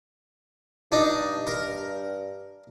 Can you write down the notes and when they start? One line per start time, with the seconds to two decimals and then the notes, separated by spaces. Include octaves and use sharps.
0.92 G2 D4 D#4
1.47 A#4